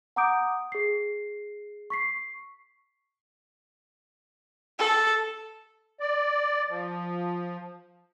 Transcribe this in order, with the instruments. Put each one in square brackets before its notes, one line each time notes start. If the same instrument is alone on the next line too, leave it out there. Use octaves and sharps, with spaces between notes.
[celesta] F#5 A#5 D6 D#6 G6 D7
G#4 C7
C#6 B6 C7
[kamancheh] A4
[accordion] D5
F3